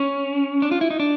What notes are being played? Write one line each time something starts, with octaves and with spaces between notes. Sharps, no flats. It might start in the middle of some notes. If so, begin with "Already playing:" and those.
Already playing: C#4
D4
F4
E4
D#4
D4